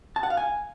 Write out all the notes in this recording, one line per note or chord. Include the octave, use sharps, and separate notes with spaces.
A5
F#5
F5
G#5